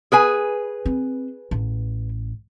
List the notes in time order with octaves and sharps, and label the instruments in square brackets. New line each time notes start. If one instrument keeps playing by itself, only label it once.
[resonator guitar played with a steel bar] G#4 B4 G#5
[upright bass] C4
A1